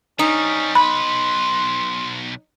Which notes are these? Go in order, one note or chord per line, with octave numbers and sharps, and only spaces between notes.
C3 G3 C#4 D#4
B1 B4 B5 C6